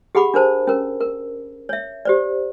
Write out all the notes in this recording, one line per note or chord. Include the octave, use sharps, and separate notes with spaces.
G4 G#4 F#5 B5 D6
D4 A#4 C5 A5
C#4 A#4
A#4
C#5 E5
G4 C5 D5